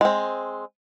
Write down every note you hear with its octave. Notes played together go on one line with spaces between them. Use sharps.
G#3 C4